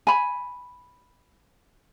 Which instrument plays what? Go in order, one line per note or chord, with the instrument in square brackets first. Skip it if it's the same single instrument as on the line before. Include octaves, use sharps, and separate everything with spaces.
[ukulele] G#5 B5